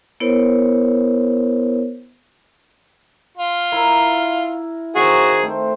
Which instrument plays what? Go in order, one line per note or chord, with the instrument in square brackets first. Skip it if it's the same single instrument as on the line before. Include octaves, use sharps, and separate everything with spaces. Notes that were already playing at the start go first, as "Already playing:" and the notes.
[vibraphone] B3 E4 A#4 C5 C#5
[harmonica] F4
[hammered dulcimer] E4 A#4
[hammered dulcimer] D#3 C4 [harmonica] F#4 G#4
[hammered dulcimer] A3 C5 G5